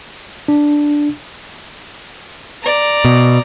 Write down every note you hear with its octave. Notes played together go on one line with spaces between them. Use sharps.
D4
D5 A#5
B2